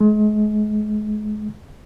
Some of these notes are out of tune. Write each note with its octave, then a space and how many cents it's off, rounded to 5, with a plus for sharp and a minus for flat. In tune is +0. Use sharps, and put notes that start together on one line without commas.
G#3 +35